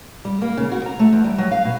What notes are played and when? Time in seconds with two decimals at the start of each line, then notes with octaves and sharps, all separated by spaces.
0.25 G3
0.42 A#3
0.57 C#3
0.72 F#4
0.86 A#5
0.99 A3
1.13 E2
1.24 G3
1.38 F#3
1.51 F5
1.65 B2